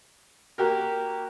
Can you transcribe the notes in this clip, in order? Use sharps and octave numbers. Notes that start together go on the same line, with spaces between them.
A#3 F#4 G4 A#4